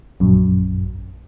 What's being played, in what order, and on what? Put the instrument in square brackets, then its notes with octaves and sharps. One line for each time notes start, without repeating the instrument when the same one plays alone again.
[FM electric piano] A#1 F#2